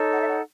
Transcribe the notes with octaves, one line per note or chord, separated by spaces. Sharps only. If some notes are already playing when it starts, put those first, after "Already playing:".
Already playing: D#4 A4 C#5
F#5
E5
F#5